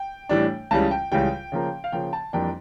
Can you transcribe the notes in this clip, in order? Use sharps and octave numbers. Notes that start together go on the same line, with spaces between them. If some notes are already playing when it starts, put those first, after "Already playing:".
Already playing: G5
A2 E3 G3 D4
C#2 C#3 E3 G3 A5
G5
C#2 C#3 E3 G3 G5
C#3 F3 A#3
F5
C#3 F3 A#3 G5
A5
F2 E3 G3 A#3 D4 G5